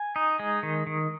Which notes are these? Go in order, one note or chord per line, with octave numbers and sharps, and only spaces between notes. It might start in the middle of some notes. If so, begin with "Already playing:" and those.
Already playing: G#5
D#4
G#3
D#3
D#3